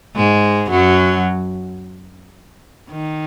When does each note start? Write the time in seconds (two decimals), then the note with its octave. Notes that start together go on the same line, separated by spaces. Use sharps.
0.16 G#2 G#3
0.70 F#2 F#3
2.91 D#3